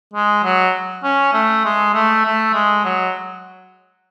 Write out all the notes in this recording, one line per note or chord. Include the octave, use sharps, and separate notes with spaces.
G#3
F#3
C#4
A3
G#3
A3
A3
G#3
F#3